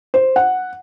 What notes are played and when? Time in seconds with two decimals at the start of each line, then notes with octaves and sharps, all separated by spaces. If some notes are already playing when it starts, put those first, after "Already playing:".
0.14 C5
0.36 F#5